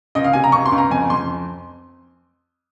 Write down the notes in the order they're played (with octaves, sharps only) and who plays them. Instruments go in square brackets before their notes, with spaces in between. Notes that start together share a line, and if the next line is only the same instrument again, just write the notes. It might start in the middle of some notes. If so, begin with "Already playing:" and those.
[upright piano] C#2 D#5
F5
C3 G#5
A#5
C#2 C#6
C6
C#2
A#5
F2 G#5
F2 C6